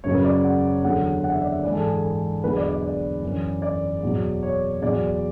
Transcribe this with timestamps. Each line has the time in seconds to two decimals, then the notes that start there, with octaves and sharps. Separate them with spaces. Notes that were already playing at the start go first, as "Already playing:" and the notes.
0.04 F#2 C#3 F#3 C#5
0.14 B4
0.25 D5
0.44 F#5
0.83 E2 D3 F#3 F#5
1.24 F#5
1.32 E5
1.41 D5
1.50 E5
1.63 G#2 E3 D5
1.74 A4
1.84 G#4
2.04 A4
2.43 E2 D3 F#3 B4
2.57 D5
2.69 D5
2.83 D5
3.22 F#2 E3
3.62 D5
4.03 E2 B2 F#3
4.43 C#5
4.82 E2 B2 F#3 D5